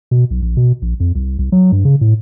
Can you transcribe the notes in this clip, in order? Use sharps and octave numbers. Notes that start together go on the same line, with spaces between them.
B2
B1
A#1
B2
A#1
F2
C2
C2
F#3
G2
C#3
A2